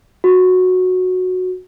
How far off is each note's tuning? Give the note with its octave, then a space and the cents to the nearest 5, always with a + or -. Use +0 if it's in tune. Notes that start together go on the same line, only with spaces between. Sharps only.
F#4 -10